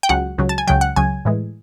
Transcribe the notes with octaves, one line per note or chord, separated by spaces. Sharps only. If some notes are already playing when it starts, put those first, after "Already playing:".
G5
C#2 C#3 F#3 F#5
C#2 C#3 F#3
A5
G#5
C#2 C#3 F#3 G5
F#5
C#2 C#3 F#3 G#5
A2 E3 G#3